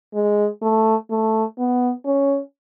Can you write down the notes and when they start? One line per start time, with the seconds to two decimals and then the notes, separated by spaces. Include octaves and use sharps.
0.14 G#3
0.62 A3
1.11 A3
1.59 B3
2.06 C#4